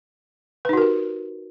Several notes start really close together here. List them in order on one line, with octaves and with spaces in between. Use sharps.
B4 D#4 F#4 A#4 G4